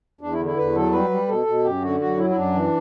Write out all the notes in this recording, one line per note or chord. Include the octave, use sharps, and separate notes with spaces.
E2 D4
E4
D3
E4
E2 B4
F#3 A4
G3 B4
G3
B2 A4
B2
F#2 G4
D3 F#4
F#2 F#4
F#3 E4
E4
F#2 D4
E3